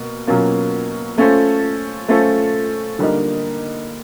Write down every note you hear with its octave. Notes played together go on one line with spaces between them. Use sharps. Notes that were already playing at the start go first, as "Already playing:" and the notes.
Already playing: B2 A#3
B2 F#3 A#3 C#4 F4
A3 C#4 F4 A4 C5
A3 C#4 F4 A4 C5
D3 G3 A#3 D#4